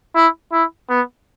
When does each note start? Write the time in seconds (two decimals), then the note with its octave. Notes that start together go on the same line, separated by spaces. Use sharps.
0.16 E4
0.53 E4
0.90 B3